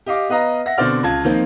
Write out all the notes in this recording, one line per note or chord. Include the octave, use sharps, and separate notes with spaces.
G4 D#5 F5 D6
B3 B4 D#5 F5 A#5
E5 F#5 A#6
B2 D3 C4 C5 D5 F6
C#2 F4 A5 G#6
D#3 F3 A#3 C4 D#4 F4